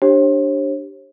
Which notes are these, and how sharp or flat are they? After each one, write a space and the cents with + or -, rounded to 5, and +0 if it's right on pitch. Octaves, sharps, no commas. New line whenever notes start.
D4 +0 G4 +0 C#5 -45